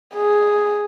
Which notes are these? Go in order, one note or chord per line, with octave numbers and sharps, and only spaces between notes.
G#4